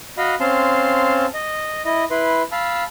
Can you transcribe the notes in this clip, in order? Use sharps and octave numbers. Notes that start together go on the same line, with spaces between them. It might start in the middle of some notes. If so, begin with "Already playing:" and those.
F#4 D#5 F5 B5
C4 C#4 F5 A5 C6
D#5
E4 D#5
E4 B4 C6
F5 A5 B5 E6